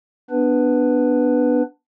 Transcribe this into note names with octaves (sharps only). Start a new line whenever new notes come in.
B3 D4 B4